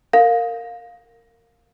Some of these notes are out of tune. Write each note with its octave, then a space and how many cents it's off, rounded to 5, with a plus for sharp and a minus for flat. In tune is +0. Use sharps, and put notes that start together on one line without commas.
A#4 -20 F5 +15